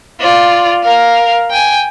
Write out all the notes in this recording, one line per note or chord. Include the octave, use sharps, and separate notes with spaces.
F4 D5
A#4 F5
G5 G#5